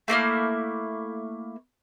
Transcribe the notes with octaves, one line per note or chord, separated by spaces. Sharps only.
A3 A#3 E4 F6